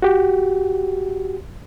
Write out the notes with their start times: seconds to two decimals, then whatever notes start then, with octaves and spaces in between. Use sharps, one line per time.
0.02 F#4 G4